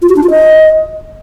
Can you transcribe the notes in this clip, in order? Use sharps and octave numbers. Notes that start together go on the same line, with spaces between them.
F4
F#4
D4
F4
D#5